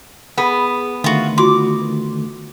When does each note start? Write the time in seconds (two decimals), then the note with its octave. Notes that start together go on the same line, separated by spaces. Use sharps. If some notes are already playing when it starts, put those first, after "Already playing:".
0.38 B3 G#4
1.04 D3 D#3 A3 F4 F#4
1.38 F4 F#4 C6 D6